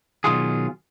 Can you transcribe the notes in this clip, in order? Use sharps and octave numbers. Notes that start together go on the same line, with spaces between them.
B2 D#3 F#3 F4 F#4 G#4